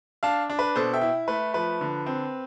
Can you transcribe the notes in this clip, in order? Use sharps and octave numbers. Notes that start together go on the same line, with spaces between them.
D4 F5 A5
D4
B4
B2 A4 C5
E5 G5
E4
A3 B4
F3 B4
D3
C4